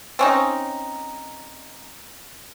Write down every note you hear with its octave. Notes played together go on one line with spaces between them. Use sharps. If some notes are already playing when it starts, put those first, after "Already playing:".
C4 C#4 D#4